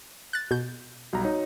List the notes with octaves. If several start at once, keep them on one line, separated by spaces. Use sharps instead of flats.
F#6 A6
B2 G6
B1 G3 F#4 A#5
D#4 C#5